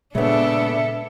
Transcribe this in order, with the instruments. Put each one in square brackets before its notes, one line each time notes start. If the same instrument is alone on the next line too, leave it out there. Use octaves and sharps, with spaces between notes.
[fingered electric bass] A#2 G#3 [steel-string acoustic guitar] C#3 B3 [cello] D4 A4 [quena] E5